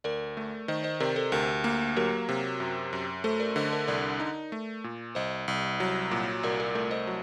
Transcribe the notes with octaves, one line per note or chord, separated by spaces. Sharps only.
D2 A#4 D5
A3
D#3 C5 D#5
C5 D#5
C3 A#4 D5
A4 C5
D2 G4 A#4
A#3
F#3 G4 A#4
C3
F#2
F#2
A3 A4 C5
A#4 D5
D3 C5 D#5
A#4 D5
C2 A#4 D5
D#4
A3
A#2
C2 C5 D#5
C2
F#3
A#2
C2 A#4 D5
A#4 D5
A3 A#4 D5
C5 D#5
F#3